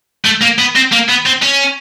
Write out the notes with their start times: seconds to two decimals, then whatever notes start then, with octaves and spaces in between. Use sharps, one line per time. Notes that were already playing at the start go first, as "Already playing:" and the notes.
0.25 A3
0.41 A#3
0.59 B3
0.75 C4
0.92 A#3
1.09 B3
1.26 C4
1.43 C#4